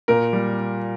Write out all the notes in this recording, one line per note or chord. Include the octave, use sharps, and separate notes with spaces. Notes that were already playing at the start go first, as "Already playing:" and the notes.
A#2 A#4
G3